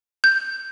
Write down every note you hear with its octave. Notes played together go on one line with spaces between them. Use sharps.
G6